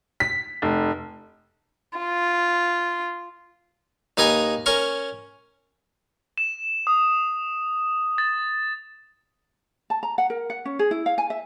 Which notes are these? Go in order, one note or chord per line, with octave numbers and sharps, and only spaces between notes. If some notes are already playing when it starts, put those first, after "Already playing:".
B6
F1
F4
D#2 D#4 B4 G#5 A#5 D#6
C#4 A#4 C#6
E7
D#6
A6
A5
A#5
F#5
A#4
F#5
C#4
G#4
E4
F5
G#5
E5